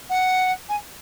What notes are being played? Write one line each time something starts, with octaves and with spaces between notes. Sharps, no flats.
F#5
G#5